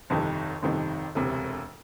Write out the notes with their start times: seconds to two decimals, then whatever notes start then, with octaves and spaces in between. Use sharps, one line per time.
0.10 G1 F2 C3 D#3
0.62 G1 F2 C3 D#3
1.15 E1 D2 C3